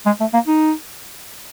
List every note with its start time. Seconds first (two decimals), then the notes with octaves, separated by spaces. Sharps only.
0.06 G#3
0.20 A3
0.33 A#3
0.47 D#4